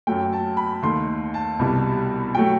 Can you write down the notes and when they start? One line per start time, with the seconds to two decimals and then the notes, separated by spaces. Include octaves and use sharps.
0.07 F#2 F#3 A3 G5
0.33 A5
0.57 B5
0.82 D#2 D#3 A3 C6
1.34 A5
1.59 C2 B2 G3
2.35 F#3 A3 G5